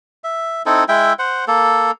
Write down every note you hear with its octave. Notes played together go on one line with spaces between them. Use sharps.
E5
C4 D#4 E4 A4
G#3 E4 E5 G5
C5 F#5
A#3 A4